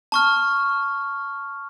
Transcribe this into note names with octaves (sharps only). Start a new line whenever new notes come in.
A5 C#6 F6